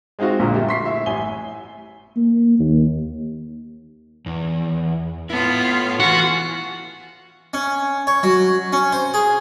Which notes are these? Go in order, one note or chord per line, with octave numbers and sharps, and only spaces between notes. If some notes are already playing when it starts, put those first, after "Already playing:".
G#3 C4 D#4 F4 F#4
A#1 A#2 D3 A#5
G3 A3
C6 C#6 B6 C7
E4 E5
A1 G#5 G7
A#3
D#2
E2
B3 E4 F4 A4
E3 F4 F#4
C#4
C#5
F#3
C#4
C5
G#4